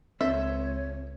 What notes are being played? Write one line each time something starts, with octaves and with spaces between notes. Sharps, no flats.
C#2 C4 A4 C5 C#5 E5